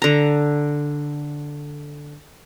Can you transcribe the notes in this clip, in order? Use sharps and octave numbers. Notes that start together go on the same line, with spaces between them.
D3 A#5